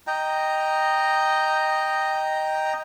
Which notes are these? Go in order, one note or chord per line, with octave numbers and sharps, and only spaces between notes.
D#5 G5 A#5